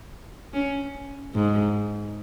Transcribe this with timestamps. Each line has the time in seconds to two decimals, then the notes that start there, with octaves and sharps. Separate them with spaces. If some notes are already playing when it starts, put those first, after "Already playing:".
0.53 C#4
1.34 G#2